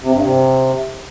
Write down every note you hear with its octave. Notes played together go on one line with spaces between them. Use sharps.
C3
G2
C3